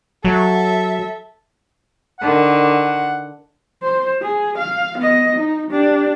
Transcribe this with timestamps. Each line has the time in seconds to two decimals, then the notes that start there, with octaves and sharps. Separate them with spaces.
0.25 F#3 A4 E5
2.20 D3 D#3 F#5
3.83 C5
4.22 G#4
4.58 F5
4.98 B3 D#5
5.36 D#4
5.71 D4 G4